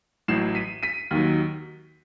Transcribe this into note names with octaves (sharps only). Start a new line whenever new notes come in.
A1 A2 F#3 C7 E7
B6 D#7
B6 D#7
D#2 D#3 F#3